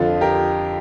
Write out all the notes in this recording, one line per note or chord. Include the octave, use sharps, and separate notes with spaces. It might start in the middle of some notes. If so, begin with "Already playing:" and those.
Already playing: F2 D3 F3 F4 A4
G4 A#4